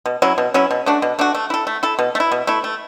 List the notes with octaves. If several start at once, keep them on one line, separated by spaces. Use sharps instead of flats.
B2
F#3 C#4 E4
B2
F#3 C#4 E4
B2
A3 D4 F#4
B2
A3 D4 F#4
A3
E4 A4
A3
E4 A4
B2
A3
E4
B2
A3 E4
A3